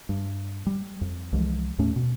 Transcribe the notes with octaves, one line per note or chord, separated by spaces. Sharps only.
G2
G3
F2
C2 E3 F3 G#3
D#2 A2 A3 C#4
B2